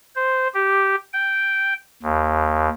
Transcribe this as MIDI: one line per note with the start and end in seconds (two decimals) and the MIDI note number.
0.16 0.48 72
0.54 0.95 67
1.13 1.73 79
2.02 2.69 39